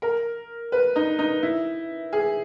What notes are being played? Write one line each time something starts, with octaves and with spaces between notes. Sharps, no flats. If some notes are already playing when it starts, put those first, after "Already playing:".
A#4
B4
D#4
D#4
E4
G#4